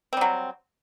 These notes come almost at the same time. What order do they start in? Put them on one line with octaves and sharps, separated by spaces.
C4 G3 F#3